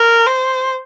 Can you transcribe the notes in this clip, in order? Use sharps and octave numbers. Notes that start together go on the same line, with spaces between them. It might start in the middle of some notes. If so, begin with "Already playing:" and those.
Already playing: A#4
C5